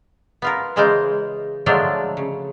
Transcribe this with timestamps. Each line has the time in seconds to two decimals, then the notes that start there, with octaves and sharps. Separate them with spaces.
0.42 B3 F4 A#4
0.76 C#3 E3 G#3 F4 A#4 C5
1.66 D3 F3 F#3 G#3 A3 D4
2.17 C#3